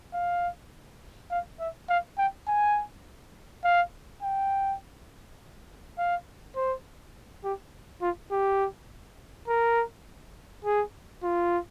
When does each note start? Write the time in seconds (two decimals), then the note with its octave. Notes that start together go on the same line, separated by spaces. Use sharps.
0.13 F5
1.31 F5
1.60 E5
1.89 F5
2.18 G5
2.48 G#5
3.64 F5
4.23 G5
5.98 F5
6.56 C5
7.44 G4
8.01 F4
8.31 G4
9.48 A#4
10.65 G#4
11.23 F4